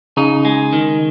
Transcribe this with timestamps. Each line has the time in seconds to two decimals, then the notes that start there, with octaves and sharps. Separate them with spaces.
0.17 C#3 D#4
0.45 G#3
0.73 D#3